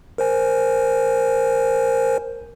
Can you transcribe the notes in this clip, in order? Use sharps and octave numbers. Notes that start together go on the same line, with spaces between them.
A#4 C5 G#5